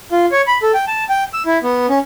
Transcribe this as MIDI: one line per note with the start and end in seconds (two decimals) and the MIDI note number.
0.12 0.26 65
0.32 0.42 73
0.47 0.58 83
0.63 0.72 69
0.74 0.85 79
0.87 1.04 81
1.09 1.24 79
1.33 1.42 88
1.46 1.58 64
1.63 1.86 59
1.89 1.99 61